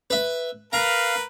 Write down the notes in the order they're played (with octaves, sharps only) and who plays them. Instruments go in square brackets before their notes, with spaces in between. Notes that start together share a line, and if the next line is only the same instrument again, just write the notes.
[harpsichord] B4 E5
[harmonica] A#4 B4 [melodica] F5 [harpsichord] A#5